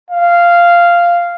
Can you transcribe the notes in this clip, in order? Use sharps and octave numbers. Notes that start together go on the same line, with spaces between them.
F5